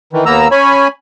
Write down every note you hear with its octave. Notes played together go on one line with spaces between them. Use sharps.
D#3 E3
D#2 A#3 B3 A#5 E6
C#4 C#5 G#5 B5